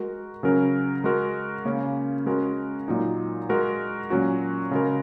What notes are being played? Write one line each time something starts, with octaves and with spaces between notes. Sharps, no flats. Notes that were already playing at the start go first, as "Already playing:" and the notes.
Already playing: G#3 F#4 A#4
C#3 F#3 C#4 A#4
G#3 F#4 A#4
C#3 A#3 C#4
G#3 C#4 F#4 A#4
A#2 F#3 D#4
G#3 F#4 A#4
A#2 F#3 C#4 F#4
C#3 G#3 F#4 A#4